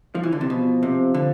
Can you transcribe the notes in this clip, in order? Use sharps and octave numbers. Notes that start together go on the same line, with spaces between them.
F3
E3
D3
C3
B2 F3
C3
D3